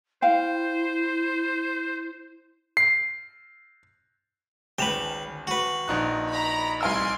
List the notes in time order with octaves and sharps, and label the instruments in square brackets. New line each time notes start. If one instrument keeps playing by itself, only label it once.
[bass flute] E4 [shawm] C5 [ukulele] F5 G5
[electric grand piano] C7
[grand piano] G#1 E7 F7 [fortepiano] C#2 [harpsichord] B4 G5
[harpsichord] F#4 B4
[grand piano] A#1 D#4 F#6
[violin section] A#5 B5
[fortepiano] C2 F5 E6 [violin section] G#5 C6 D7